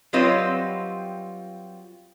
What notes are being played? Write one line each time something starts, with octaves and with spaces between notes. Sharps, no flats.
F#3 G3 C4 F4 B4 D#5